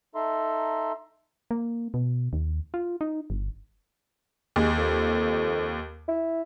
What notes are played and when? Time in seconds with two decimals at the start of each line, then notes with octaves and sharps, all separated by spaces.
0.15 D#4 A4 E5 A#5 C6
1.51 A#3
1.94 B2
2.33 D#2
2.74 F4
3.01 D#4
3.30 G1
4.56 D#2 G#3
4.77 F2
6.08 E4